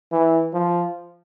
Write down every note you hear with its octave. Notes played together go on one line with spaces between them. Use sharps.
E3
F3